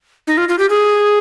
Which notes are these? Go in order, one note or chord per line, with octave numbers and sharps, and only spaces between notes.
D#4
F4
F4
G4
G#4